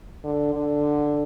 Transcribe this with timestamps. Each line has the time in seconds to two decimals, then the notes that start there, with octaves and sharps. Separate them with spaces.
0.24 D3
0.54 D3